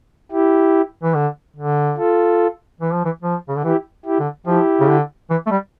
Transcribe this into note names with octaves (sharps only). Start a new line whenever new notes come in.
E4 G4
E3
D3
D3
F4 A4
E3
F3
E3
F3
C#3
D3
E3 E4 G4
E4 G4
D3
F3 E4 G4
C#3
D3
E3
A3
G3